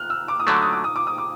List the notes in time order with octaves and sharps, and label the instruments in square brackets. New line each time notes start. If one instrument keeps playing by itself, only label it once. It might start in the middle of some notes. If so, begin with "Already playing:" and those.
Already playing: [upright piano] F6 F#6
E6
D6
D#6
[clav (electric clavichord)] D3 F#3 A3 [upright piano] D6
[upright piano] D#6
D6
D#6
D6
D#6
D6